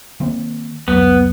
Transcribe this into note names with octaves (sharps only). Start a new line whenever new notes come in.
D#3 A#3 C4
C2 F2 F#3 B3